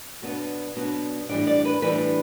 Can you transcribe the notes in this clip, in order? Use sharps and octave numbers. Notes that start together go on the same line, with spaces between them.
B2 F#3 B3 D4
B2 F#3 B3 D4
A2 E3 G3 D4 D5
D5
B4
A2 E3 G3 D4 B4